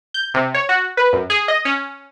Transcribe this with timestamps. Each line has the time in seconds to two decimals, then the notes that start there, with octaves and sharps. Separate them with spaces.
0.14 G6
0.34 C3
0.54 C#5
0.69 F#4
0.97 B4
1.13 F#2
1.30 G#4
1.48 D#5
1.65 C#4